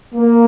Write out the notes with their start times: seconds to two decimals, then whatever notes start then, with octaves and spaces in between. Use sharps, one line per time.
0.15 A#3